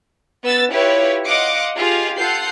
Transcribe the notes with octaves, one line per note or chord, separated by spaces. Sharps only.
B3 E6 A6
E4 F4 G4 B4 C#5
D#5 F5 F#5 C6 D6 C#7
F4 G4 G#4 D#5
F4 A4 F#5 G6 C7